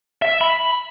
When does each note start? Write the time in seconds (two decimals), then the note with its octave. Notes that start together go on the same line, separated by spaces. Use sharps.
0.22 E5
0.41 B5